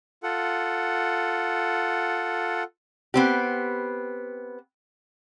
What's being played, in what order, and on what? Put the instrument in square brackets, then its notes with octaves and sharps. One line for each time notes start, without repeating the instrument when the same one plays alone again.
[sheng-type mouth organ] F4 A4 F#5
[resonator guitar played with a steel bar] B3 C4 G4